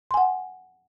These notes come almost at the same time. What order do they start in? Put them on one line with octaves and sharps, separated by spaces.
C6 G#5 F#5